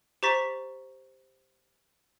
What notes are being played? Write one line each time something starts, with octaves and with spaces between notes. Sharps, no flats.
G4 C5 A#5 C#6 A6 B6